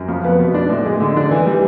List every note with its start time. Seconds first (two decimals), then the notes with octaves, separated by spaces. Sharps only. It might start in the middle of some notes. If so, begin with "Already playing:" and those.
Already playing: F#2
0.08 F2
0.24 B3
0.39 B2
0.54 D4
0.70 A2
0.86 G#3
1.00 D3
1.16 D4
1.31 E3
1.46 G3